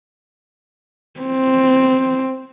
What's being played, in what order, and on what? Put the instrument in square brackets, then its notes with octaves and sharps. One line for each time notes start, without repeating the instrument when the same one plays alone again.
[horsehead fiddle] C4